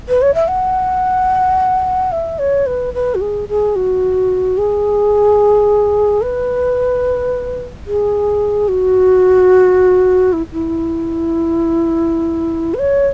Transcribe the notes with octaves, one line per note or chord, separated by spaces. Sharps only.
B4
C#5
E5
F#5
E5
C#5
B4
B4
F#4
G#4
G#4
F#4
G#4
B4
G#4
F#4
E4
E4
B4
C#5